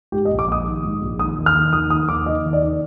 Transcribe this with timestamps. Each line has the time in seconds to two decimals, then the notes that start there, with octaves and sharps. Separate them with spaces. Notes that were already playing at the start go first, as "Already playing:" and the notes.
0.12 G#2 G4
0.25 D#5
0.31 A#1
0.39 D6
0.48 A#1 D#6
0.66 D#3
0.84 G#2
1.02 A#1
1.19 D#3 D#6
1.37 D#2
1.46 F6
1.55 D#3
1.73 D#2 D#6
1.90 D#3 D#6
2.08 D#2 D6
2.26 D#3 D#5
2.45 D#2
2.53 D5
2.62 D#3